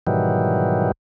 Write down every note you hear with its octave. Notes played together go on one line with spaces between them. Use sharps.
G#2 B2 D#3 E3 F#3 G3